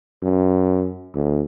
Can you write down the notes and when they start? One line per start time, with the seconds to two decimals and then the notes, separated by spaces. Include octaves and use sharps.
0.22 F#2
1.15 D2